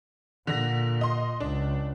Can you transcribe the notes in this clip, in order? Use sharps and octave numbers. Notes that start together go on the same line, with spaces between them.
A#2 D3 A#6
D#5 C6
C#2 D4